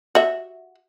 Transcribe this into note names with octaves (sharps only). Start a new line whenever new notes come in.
F#4 E5